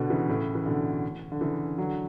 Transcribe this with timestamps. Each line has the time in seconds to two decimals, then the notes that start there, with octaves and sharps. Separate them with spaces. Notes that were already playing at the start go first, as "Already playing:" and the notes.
Already playing: B2 D3
0.10 C#3 E3
0.28 A2 C#3
0.55 E3
0.66 B2 D3
1.32 D3
1.41 C#3 E3
1.78 D3 F#3